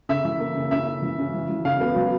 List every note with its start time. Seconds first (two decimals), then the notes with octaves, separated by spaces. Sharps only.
0.09 C#3 E5
0.25 E3
0.40 A#3
0.56 C#3
0.71 C#3 E5
0.87 C#3
1.02 E3
1.19 C#3
1.34 E3
1.49 E3
1.65 C#3 F5
1.80 B3
1.96 F#3